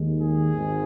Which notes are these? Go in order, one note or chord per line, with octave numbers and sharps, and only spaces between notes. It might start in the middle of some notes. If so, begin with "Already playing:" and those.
Already playing: D#2 D#3 G#3
G#4
G#1 G#2 G#3